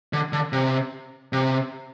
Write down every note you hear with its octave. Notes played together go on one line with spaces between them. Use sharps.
D3
D3
C3
C3